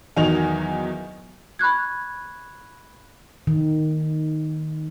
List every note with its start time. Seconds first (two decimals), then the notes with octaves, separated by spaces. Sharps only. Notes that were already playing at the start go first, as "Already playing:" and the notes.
0.17 E2 D#3 F#3 D#5 F7
1.59 B5 C#6 F#6 G#6
3.47 D#3